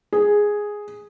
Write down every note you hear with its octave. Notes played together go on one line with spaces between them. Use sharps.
G#4